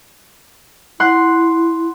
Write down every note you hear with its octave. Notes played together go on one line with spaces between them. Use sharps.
E4 F#5 C6 F#6